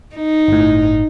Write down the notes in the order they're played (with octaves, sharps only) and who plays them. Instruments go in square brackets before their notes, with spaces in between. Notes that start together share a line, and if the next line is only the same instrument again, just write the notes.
[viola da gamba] D#4
[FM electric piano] G1 A2